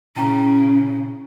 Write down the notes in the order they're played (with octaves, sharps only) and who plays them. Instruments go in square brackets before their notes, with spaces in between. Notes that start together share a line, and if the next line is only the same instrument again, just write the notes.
[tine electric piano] A#2 [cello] C#3 [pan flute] C#4 [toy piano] E4 G5 A#5